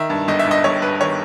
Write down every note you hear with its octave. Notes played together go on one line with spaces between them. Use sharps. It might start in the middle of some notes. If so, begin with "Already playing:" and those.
Already playing: D#3 E5
G2
G1 D#5
E5
G2
D#5
G1 C#5
G2 B4
D#3 C#5